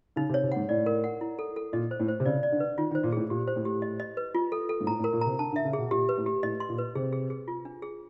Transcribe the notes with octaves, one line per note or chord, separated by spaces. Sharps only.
C#3 D#4
C3
C#5
C3
G#2 F#5
A2 D5
A#4
F#5
E4
A4
A4
A#2 D#5
C5
A2
C5
C3
C#3 D5
D5
D3
B4
D#3 F4
D#3
C5
A#2
A2 G#4
A#2 G4
C5
A2
G4
D#5
D#5
B4
F4
A4
A4
G#2
A2 A#5
A2
A#4
A#2
C3 A#5
D3 A5
D3
E5
C#3
G#4
B2
A#2 G4
B4
A2
G4
A2 D#5
C6
A#2
B4
C3 G#4
G#4
G#4
F4
D4
G#4